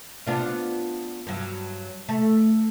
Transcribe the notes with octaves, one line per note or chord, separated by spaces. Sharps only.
B3 D4 F4
G2 F#3
A3